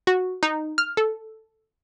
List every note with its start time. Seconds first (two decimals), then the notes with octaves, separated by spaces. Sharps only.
0.07 F#4
0.43 D#4
0.78 F6
0.97 A4